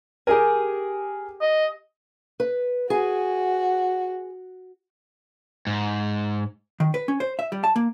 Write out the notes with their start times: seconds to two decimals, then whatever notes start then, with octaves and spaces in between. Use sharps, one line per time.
0.27 G4 G#4 A#4 G#5
1.42 D#5
2.40 B4
2.90 F#4 G#4 G#5
5.67 G#2
6.80 D#3
6.94 B4
7.08 C#4
7.20 C5
7.39 E5
7.52 G3
7.64 A5
7.76 A#3